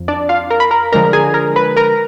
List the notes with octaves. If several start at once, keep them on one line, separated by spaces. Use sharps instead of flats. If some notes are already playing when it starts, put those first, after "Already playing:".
Already playing: F2 F3
D4 D5
F4 F5
A#4 A#5
B5
A#4 A#5
D3 F3 G#3 D4 A#4 A#5
G#4 G#5
A#4 A#5
B4 B5
A#4 A#5